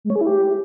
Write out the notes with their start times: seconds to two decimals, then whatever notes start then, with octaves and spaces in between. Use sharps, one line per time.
0.04 G#3
0.10 C#5
0.16 G#4
0.21 E4
0.27 G4